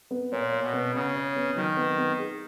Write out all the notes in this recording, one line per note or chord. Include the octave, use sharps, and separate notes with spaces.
B3
A#2 C#5
C#5
B2
B3
C#3 B3
C#5
B3
D#3 F#3
B3
B3
G#4